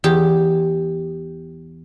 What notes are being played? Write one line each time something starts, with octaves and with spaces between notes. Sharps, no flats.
E2 G4